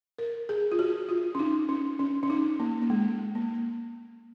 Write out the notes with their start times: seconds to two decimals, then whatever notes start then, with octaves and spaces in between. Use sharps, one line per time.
0.18 A#4
0.49 G#4
0.72 F4
0.79 F#4
1.09 F4
1.35 C#4
1.39 D#4
1.69 C#4
1.99 C#4
2.23 C#4
2.30 D#4
2.60 A#3
2.82 A#3
2.90 G#3
3.35 A#3